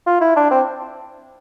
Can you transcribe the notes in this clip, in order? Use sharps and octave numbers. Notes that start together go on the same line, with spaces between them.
F4
E4
D4
C4